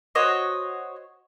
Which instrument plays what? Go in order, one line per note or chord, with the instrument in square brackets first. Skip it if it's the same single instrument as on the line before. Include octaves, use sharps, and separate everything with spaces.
[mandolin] F#4 C5 C#5 D#5